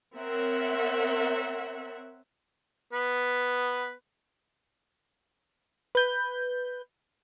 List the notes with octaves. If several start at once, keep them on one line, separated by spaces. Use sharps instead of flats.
C4 A#4 C#5 E5 F#5
B3 B4
B4 G6